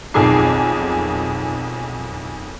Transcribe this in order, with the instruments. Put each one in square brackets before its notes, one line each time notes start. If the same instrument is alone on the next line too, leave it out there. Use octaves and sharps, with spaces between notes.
[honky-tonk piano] B1 F2 D#3 G#4 D6 C7